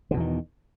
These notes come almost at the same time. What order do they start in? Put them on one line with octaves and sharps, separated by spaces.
D3 B2 E2 D#3